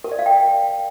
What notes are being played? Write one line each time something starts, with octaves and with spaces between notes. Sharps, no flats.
A#4
D5
F5
G5